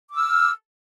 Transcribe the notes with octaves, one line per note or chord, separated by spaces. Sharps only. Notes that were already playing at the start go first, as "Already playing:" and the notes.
D6 E6 F6